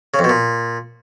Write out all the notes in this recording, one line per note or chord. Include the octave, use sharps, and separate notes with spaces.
C#3
F2
B2
A#2